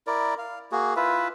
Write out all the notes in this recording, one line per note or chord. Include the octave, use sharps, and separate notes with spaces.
E4 A#4 D5
F5
A#3 F#4 G#4
E4 F4 B4 E5